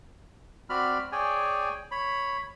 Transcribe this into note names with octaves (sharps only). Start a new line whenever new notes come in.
C4 F#4 D5 B5 F6
G#4 C#5 D5 G5 G#5
C#5 B5